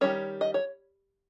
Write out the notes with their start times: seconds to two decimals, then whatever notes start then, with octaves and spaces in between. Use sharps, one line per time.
0.01 D#3 G3 C#4 C#5
0.41 D#5
0.54 C#5